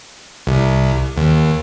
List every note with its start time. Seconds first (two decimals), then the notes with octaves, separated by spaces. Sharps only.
0.47 C2
1.17 D#2